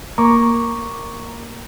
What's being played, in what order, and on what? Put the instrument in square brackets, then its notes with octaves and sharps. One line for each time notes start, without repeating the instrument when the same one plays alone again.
[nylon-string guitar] A#3 [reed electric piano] A#5 C#6 D6